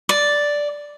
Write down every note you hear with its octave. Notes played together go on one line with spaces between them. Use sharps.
D5